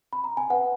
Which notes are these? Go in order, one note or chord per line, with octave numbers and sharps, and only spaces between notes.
B5
A#5
G#5
B4 F#5